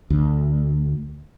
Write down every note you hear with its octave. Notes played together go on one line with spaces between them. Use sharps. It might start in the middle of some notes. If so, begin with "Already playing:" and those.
D2